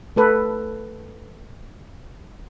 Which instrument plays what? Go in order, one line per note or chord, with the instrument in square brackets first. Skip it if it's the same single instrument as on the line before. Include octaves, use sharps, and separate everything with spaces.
[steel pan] A3 A4 B4